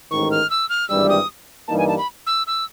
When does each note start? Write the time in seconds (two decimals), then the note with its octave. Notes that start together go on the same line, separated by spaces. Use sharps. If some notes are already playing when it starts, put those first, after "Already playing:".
0.11 A1 G#2 D#3 C#6
0.31 F6
0.50 E6
0.69 F6
0.89 G#1 G2 E3 G3 E6
1.09 D#6
1.68 G2 E3 G3 A#3 D#4 A5
1.78 G#5
1.88 A5
1.98 B5
2.27 E6
2.47 E6